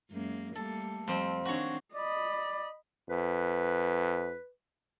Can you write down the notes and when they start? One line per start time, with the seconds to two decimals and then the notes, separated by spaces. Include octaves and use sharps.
0.11 F#2 G#3 A#3
0.56 G3 A3 A#3 A4
1.08 F2 G3 C4
1.45 D#3 C4 D4 F#4 C#5
1.94 D5 D#5 B5
3.10 F2 B4